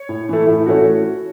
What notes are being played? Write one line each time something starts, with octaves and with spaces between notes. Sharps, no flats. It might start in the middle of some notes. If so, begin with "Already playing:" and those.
Already playing: C#5
A2
E3 A3
A2 E4
E3 A3 C#4 F#4